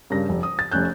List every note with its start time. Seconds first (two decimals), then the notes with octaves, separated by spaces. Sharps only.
0.10 G2 C#3 A#4 A#6
0.29 F1
0.43 D#6
0.59 A6
0.71 F1 A3 C#4 F#6 G6